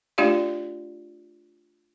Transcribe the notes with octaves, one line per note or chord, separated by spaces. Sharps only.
A3 D4 F4 G4 D5 F5